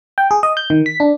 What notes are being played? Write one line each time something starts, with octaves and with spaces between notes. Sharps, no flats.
G5
G#4
D#5
G6
D#3
B6
D4